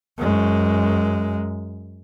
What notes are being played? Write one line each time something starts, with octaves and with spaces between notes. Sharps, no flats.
F#2 G#3